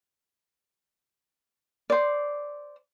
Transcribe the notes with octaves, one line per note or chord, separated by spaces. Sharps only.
C5 D5